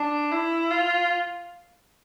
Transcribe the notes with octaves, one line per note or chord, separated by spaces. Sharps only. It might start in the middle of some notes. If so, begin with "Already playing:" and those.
Already playing: D4
E4
F4